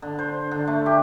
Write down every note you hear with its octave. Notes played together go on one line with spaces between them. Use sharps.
D3
C5
D3
A3
G4